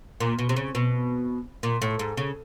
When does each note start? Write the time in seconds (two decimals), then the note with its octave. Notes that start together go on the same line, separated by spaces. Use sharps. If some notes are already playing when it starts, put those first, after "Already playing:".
0.20 A#2
0.39 B2
0.49 C3
0.56 C#3
0.75 B2
1.63 A#2
1.82 A2
1.99 G#2
2.17 C#3